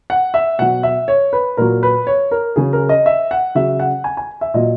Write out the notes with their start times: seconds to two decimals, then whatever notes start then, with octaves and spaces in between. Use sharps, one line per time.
0.10 F#5
0.34 E5
0.58 B2 F#3 F#5
0.83 E5
1.08 C#5
1.33 B4
1.57 A#2 F#3 A#4
1.83 B4
2.07 C#5
2.31 A#4
2.56 C#3 F#3 G#4
2.73 A#4
2.89 D#5
3.06 E5
3.31 F#5
3.55 C#3 F#3 E5
3.80 F#5
4.04 G#5
4.17 G#5
4.41 E5
4.54 A#2 F#3 D#5